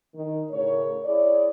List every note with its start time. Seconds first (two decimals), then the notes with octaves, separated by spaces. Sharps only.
0.15 D#3
0.51 A2 C#3 A#4 C#5
1.05 E4 G#4 C#5 D5